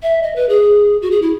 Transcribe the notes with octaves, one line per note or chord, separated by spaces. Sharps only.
E5
D#5
B4
G#4
F#4
G#4
E4